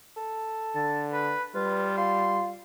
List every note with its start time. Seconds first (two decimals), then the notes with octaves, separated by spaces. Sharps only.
0.17 A4
0.75 D3 A5
1.13 B4
1.55 G3 F4 B4
1.97 F4 C6